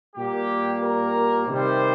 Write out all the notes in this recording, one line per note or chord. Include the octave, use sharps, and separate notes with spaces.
A#2 G3 A#3 G4
A#4
C3 D#3 G3 C5